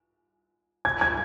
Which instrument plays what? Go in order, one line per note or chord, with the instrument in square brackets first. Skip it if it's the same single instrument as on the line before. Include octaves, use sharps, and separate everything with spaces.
[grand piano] G#6
G#6